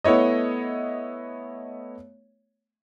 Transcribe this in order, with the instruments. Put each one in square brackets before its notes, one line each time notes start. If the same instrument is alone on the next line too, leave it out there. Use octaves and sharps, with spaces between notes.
[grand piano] A3 B3 E4 C#5 D#5